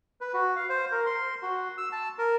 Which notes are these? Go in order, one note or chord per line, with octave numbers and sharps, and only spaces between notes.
B4
F#4
F5
C5
A#4
C6
F#4
E6
A5
A#4